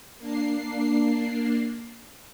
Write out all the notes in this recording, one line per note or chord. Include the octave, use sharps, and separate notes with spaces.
A#3 D4 C7